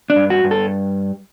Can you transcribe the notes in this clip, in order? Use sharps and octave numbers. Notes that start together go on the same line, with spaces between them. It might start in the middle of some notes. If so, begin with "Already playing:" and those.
D4
G2
F#4
G2
A4